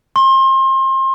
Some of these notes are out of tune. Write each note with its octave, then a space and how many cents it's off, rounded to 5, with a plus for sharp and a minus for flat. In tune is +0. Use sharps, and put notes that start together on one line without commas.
C6 +30